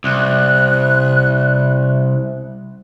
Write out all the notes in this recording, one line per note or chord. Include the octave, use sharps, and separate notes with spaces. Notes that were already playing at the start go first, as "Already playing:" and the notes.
C2 F#6